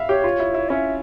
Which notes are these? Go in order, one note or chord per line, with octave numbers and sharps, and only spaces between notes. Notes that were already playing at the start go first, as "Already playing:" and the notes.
Already playing: E5 F5
G4 C#5
F4
E4
E4
C#4 E5